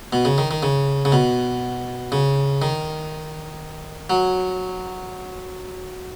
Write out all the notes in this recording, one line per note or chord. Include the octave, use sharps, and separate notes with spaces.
B2
C#3
D#3
D#3
C#3
C#3
B2
C#3
D#3
F#3